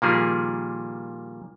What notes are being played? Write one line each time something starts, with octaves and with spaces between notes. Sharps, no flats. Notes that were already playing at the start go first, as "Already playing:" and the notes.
A#2 D#3 F3 G3 A#3 G#4